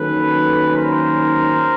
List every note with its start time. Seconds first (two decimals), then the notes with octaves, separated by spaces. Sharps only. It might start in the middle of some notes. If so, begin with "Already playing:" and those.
Already playing: D#3 F#3 A#3 C#4 A4 B4
0.75 A#4 C5